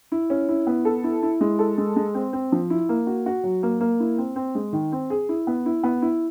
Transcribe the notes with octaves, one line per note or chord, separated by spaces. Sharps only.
E4
C#4
E4
B3
A4
E4
E4
G#3
A4
G#3
G#3
C4
C4
F3
E4
A#3
F#4
F#4
F#3
A#3
A#3
E4
C4
C4
G#3
D#3
C4
G#4
E4
B3
E4
B3
E4